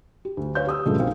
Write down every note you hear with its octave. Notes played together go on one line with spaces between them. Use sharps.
G4
D2
B4 C#5 F5 G6
G4 D#6 E6
G2 A#2 C#3 F3 G#3 A3
B1 F#3 C4 A#4 F5